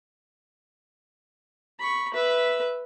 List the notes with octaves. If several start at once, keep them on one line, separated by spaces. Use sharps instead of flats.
B5 C#6
B4 E5